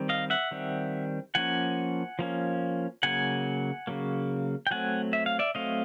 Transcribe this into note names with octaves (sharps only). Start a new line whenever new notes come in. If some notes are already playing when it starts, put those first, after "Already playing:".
Already playing: D#3 G3 C4
D#5 F5
E5 F#5
D#3 G3 C4
F3 A#3 C#4 F#5 G#5
F3 A#3 C#4
C#3 F#3 A#3 F#5 G#5
C#3 F#3 A#3
G5
F#3 A3 C4 F#5 G#5
E5
F5
D5 E5
F#3 A3 C4 D#5 F5